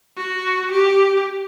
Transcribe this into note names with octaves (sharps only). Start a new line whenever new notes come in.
F#4
G4